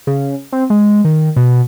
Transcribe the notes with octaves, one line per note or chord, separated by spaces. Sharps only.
C#3
C4
G#3
D#3
B2